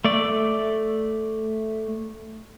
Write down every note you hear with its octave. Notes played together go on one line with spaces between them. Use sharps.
A3 D5